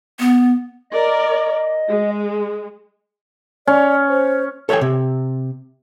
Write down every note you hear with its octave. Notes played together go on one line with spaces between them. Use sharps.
B3
A#4 D5 D#5
G#3
C#4 D5
C5
A4 C#5 D#5 G5 G#5
C3